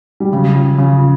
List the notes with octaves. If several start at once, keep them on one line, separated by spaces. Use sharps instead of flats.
G3
C#3 F#3
F3
C#3 F3
F3